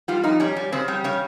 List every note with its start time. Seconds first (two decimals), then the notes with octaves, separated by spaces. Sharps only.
0.08 G3 F4
0.23 F2 D#4
0.40 G3 C#4
0.56 G3
0.72 C#3 C4
0.88 G3
1.04 C#3 C#4